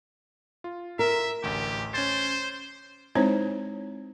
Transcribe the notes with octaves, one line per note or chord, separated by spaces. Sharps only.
F4
A#4 E5
A1 D2 G4
C#4 C5 G#6 A6
G#3 C4 D#4 E4 C5 C#5